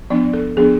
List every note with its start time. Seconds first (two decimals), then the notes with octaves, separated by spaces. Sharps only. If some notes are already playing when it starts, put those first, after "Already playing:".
0.10 F3 B3 D4 D5
0.33 A4
0.57 F3 B3 D4 G#4